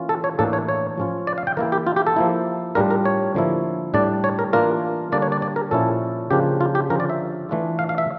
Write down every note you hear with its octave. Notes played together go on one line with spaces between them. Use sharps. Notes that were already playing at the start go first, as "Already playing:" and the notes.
Already playing: E3 A#3 C#4 F4
A4
C#5
A2 E3 A#3 D4 A4
C#5
C#5
F3 C#4 F4
D5
F5
G5
E3 A#3 E4 A#4
G4
F4
G4
A4
F3 A#3 E4
A2 G3 D4 F4 A#4
A#4
C#5
D3 F3 A#3 E4
A2 G3 D4 D5
C#5
A#4
E3 A#3 D4 F4 A#4
D3 G3 A#3 D4 D5
C#5
D5
D5
A#4
A#2 F3 C#4 E4 A4
C#3 F3 A#3 D4 F4 G4
F4
G4
D3 F3 C#4 F4 A#4
D5
E5
E3 A3 D4 F4
F5
F5
E5